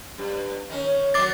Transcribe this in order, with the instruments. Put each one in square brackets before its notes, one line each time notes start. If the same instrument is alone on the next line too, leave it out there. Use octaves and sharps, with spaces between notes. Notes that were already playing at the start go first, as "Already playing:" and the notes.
[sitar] G2
D#3 C#4
[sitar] D#3 F#3 [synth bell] D6 A6